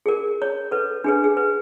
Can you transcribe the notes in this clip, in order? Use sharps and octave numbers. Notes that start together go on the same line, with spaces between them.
G#4 A#4
C#5
A4 B4
D4 G#4 B4
G#4
B4